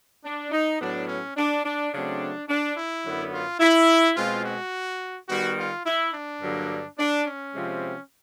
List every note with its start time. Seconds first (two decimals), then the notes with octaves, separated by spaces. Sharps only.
0.24 D4
0.51 D#4
0.79 A2 F#3 B3 D4
1.07 C#4
1.36 D4
1.64 D4
1.91 C#3 F#3 A3 C4 D4
2.48 D4
2.76 E4
3.05 F#2 D3 F#3 B3
3.32 F4
3.60 E4
4.16 B2 G#3 C4 F4
4.45 F#4
5.28 D#3 G3 B3 F#4
5.58 F4
5.86 E4
6.13 D4
6.41 G2 D3 F#3 A#3
6.98 D4
7.25 C#4
7.53 C3 F3 G#3 C4